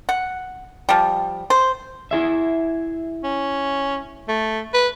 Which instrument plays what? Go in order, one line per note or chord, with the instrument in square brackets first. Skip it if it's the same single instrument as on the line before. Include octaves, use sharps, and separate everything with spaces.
[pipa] F#5
F3 G3
C5
[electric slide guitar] E4 G#4 E5
[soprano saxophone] C#4
A3
B4